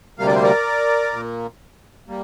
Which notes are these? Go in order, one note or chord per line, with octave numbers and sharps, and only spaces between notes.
D2 C3 G3 A#3 F5
D5
C5
A#4 D5
A#2 A#3
G3 A#3